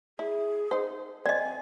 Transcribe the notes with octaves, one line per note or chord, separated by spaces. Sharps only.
E4 G#4
D#4 C5
C4 D5 D#5 G#5